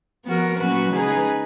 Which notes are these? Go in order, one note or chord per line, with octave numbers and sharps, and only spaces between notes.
F3 B3 F#4 A#4
A#2 F#3 C#4 F#4 B4
C#3 G#3 D#4 G#4 B4